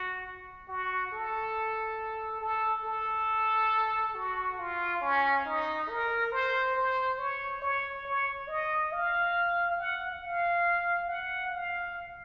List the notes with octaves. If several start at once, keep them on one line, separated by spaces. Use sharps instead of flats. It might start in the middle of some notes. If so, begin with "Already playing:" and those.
Already playing: F#4
F#4
A4
A4
A4
F#4
F4
C#4
D#4
A#4
C5
C5
C#5
C#5
C#5
D#5
F5
F#5
F5
F#5
F5